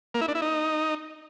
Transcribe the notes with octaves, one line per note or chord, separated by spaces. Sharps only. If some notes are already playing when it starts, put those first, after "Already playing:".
A#3
E4
D4
E4
D#4